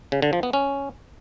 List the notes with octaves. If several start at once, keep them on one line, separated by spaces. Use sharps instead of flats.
C#3
D3
F3
B3
C#4